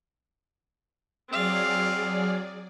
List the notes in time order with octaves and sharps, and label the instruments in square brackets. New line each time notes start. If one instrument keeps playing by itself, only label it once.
[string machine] F#3 G#4 D5 [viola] C4 F5